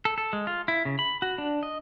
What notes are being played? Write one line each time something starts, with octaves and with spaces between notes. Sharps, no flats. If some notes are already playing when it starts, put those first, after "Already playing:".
A4
A4
G#3
F4
E4
C#3
B5
F#4
D4
D#5